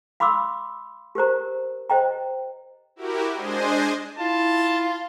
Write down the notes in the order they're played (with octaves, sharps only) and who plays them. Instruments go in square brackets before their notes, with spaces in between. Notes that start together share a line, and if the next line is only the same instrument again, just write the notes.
[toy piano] F5 B5 C6 D6 E6
G4 A#4 C5 A#5
C5 D#5 G5 A#5
[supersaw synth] E4 F#4 G4 A#4
G#3 D4 C5 D#5 G#5
[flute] E4 [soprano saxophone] F4 [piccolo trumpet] A5